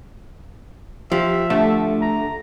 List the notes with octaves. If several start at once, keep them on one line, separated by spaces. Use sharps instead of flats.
F3 G4 E5
D3 A3
A#5